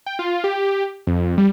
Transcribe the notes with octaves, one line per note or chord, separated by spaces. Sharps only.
G5
F4
G4
F2
G3